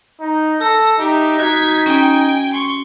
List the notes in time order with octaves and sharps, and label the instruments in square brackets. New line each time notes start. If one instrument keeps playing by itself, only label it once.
[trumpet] D#4
[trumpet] A4 [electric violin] A#6
[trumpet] D#4 [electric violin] G4 E5
[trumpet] D#4 [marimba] F#4 [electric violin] G#6 B6
[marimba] C#4 [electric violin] G5 G#5
[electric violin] C6 C#6